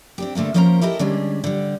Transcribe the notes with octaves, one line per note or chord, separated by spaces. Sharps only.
C4 D4 G4
D3 A3 A#3 C4
F3 A#3 C#4 A#4 C5 A#5
E4 G4 A4 A#4 D#5
D3 G3 G#3 C#4 D4
D3 G3